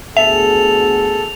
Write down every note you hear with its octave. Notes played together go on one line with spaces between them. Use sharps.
D2 B3 G#4 A4 E5 F7